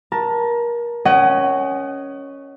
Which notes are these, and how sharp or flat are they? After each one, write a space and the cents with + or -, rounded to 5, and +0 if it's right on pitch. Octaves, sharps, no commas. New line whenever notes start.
A#4 +30 A5 +15
C#4 +0 D#5 -5 F#5 +35